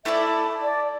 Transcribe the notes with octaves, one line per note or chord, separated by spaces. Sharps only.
A3 E4 A4 D5 E5
D5